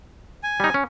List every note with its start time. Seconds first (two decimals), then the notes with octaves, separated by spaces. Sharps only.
0.43 G#5
0.60 G3 D#4
0.74 C#4